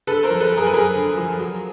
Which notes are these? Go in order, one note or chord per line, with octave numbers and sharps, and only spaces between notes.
D3 A4 B4
A#4 C5
F3
A4 B4
F#2
G#4 A#4
B4
F#2 G#4 A#4
D3
F3
F#3